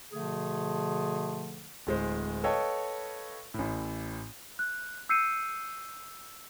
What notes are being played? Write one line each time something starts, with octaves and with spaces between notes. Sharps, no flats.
B2 D3 F3 A3 G#4
D1 G#3 C5
A4 B4 C#5 D#5 F5 G5
A1 A2
F#6
E6 G6 C7 C#7 D#7